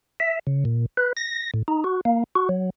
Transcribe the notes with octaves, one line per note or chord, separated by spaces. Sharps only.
E5
C#3
A#2
B4
A#6
A2
D#4
F#4
A#3
F#4
F#3